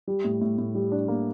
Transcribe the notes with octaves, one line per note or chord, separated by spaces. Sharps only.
G3
A2
A2
A2
G3
D4
A#3